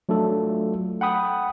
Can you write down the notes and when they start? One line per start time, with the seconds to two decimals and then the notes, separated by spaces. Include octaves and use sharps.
0.09 F#3 A3 D4 F4 A4
1.01 F#5 G5 B5 D#6